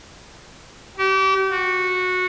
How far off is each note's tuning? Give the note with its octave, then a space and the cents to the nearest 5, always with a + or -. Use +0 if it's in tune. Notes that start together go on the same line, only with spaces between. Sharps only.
G4 -35
F#4 -15